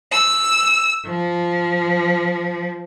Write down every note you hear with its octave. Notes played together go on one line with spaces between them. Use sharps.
E6
F3